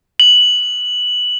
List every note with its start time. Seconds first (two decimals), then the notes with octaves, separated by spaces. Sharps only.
0.20 F#7